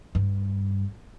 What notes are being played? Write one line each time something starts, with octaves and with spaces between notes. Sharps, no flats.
G2